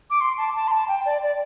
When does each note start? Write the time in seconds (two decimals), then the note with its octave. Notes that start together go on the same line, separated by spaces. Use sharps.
0.10 D6
0.21 C6
0.38 A5
0.55 A5
0.68 C6
0.72 A5
0.88 G5
1.06 D5
1.23 D5